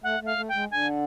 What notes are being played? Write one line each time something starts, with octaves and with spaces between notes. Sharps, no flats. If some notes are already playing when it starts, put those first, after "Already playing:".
A3 F#5
A3
F5
A3
G5
G#3
D3 G#5